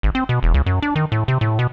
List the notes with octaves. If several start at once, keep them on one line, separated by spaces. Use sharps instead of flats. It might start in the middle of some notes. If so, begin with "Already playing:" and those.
G#1
C4
B2
E1
C#2
F#2
D4
D#3
A2
C3
A2
B2